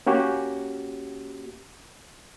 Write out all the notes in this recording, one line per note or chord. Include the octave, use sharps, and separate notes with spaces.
A#3 C#4 F#4 G4